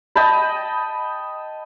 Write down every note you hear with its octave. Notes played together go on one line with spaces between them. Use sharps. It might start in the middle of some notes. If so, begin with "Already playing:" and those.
D#5 G5 A5 B5